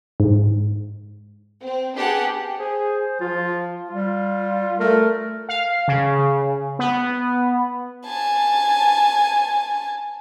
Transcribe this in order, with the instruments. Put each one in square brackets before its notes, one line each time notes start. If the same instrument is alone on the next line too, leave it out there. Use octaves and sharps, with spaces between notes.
[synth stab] G#2
[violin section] C4
B3 D4 G4 G#4 F#5 A5
[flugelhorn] G#4 [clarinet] C5
[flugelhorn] F3 [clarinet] F4
[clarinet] G3 [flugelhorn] F4
[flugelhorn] A3 [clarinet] A#4
[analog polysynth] F5
C#3
B3
[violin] G#5 A5